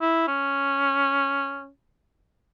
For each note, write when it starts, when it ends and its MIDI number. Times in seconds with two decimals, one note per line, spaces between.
0.01 0.24 64
0.28 1.69 61